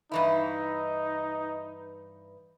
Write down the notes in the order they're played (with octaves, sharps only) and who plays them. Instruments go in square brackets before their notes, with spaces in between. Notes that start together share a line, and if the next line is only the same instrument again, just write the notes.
[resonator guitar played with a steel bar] G2 E3 E4 [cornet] D#4